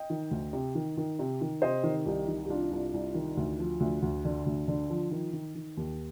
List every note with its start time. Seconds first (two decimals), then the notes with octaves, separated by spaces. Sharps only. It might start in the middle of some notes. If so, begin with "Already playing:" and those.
Already playing: D#5 G5
0.10 D#3
0.31 D2
0.53 C3
0.75 D#3
0.97 D#3
1.19 C3
1.41 D#3
1.62 C3 C5 D#5
1.83 D#3
2.06 C2 D#4 G4
2.28 D#3
2.45 G4
2.49 C2 D4 F4
2.72 C2
2.94 C2
3.14 D#3
3.37 D2
3.59 F3
3.80 D2
4.02 D2
4.25 D3
4.46 D2
4.68 D3
4.90 F3
5.11 D#3
5.33 D#3
5.55 D#3
5.77 D#2